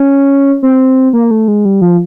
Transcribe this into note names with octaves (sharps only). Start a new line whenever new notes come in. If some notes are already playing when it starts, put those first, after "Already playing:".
Already playing: C#4
C4
A#3
A3
G#3
G3
F3